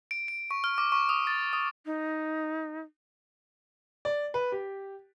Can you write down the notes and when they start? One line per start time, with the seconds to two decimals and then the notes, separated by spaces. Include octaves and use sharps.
0.11 D7
0.28 D7
0.51 C#6
0.64 F6
0.78 D6
0.92 C#6
1.09 D#6
1.27 A6
1.53 D#6
1.85 D#4
4.05 D5
4.34 B4
4.52 G4